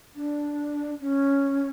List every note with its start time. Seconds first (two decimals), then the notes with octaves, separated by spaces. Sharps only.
0.16 D4
1.00 C#4